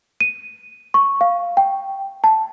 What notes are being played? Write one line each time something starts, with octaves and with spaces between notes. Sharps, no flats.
D#7
C#6
F5
G5
A5